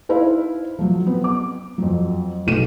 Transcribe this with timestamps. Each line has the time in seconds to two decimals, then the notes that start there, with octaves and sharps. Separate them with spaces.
0.09 D#4 E4 C5 F5
0.79 F3 F#3
1.06 B3 C4
1.24 D6
1.78 F2 F#3
2.46 F1 B1 A3 D#7 E7